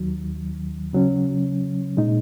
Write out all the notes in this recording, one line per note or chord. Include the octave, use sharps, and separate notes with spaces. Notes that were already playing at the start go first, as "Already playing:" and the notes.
Already playing: D#2 D#3 F#3
C#3 F#3 C#4
A#2 G#3 D#4